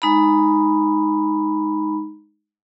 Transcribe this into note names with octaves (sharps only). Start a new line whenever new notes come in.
G#3 D#4 A#5 B5